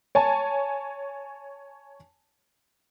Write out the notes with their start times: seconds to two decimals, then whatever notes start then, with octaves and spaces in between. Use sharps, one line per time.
0.15 C#5 G#5 A5